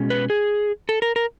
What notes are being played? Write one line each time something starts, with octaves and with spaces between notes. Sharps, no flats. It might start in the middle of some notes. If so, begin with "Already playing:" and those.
Already playing: B2 G#3 C#4
B4
G#4
A4
A#4
A#4